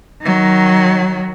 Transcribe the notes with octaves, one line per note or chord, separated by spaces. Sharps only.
D#3 F#3